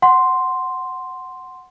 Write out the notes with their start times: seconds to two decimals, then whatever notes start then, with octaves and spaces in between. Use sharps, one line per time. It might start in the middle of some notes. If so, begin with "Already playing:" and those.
0.02 F#5 C6